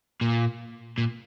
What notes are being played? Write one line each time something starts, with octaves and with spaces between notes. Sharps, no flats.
A#2
A#2